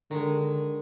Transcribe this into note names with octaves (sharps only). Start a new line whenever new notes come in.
D3 D#3 G#3